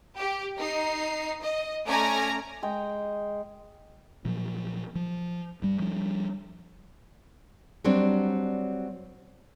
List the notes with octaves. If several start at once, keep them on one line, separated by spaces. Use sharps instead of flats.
G4
D#4 C7
D#5
A3 C#4 D5 G#5 A#5 A#6
G#3 G5
A#2 F3 F#3
F3
G2 G3
F3 G3 D4
F#3 G3 C4 D4 F#4 C#5